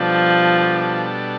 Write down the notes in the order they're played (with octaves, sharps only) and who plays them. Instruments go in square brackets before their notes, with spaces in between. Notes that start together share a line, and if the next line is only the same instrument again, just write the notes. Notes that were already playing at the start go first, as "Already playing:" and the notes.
Already playing: [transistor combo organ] B2 G3 D4 A4 [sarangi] F3